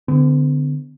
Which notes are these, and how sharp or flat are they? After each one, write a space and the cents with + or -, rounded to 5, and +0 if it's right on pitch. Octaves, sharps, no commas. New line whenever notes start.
D3 +0 B3 +45